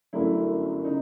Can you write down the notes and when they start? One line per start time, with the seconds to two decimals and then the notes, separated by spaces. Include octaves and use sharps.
0.13 G1 F#2 D3 F#3 A3 E4
0.85 C#3 D#4